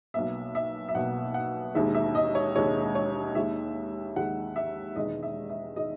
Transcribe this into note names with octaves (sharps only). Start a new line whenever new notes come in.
B1 B2 A#3 E5
E5
E5
B1 B2 A#3 F#5
F#5
E1 D#2 D#3 G#3 E5
E5
D#5
C#5
E1 D#2 D#3 G#3 C#5
C#5
D#2 D#3 G#3 E5
D#2 D#3 G#3 F#5
E5
E1 E2 D#3 G#3 D#5
E5
E5
D#3 G#3 D#5